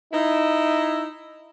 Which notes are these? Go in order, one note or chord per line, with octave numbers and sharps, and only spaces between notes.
D#4 E4